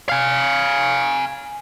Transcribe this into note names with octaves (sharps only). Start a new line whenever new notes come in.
F5 G#5